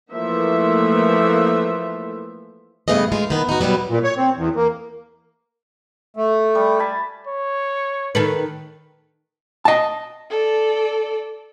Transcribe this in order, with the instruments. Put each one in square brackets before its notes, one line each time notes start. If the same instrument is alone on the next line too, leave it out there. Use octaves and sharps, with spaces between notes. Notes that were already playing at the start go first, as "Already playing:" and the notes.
[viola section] E3 F3 A3 A#3 E5
[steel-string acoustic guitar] G2 C#3 A3 B3 G#4 D#5
G#3 F4
D#3 B3
D#4 F#4
B2 F#3 G3 B3
[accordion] A#2
C#5
C4
E2
A#3
A3
[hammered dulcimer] G3
G#5 A5 B5
[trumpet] C#5
[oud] D#3 A4 B4
[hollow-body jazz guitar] D#5 A5
[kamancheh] A4 D5